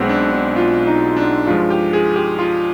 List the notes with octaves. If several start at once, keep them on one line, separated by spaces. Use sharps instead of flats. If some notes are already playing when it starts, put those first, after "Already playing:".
Already playing: B1 B2 G#3 B3 C4
D4
D4
F4
D#4
D4
G2 F3 G#3 F4
G4
G#4
G4
F4